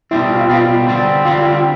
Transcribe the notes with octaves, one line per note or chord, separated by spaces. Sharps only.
B2 G3 C4 E4
F4
B2 G3 C4
D3 G3 C4
D3 G3 C4 F4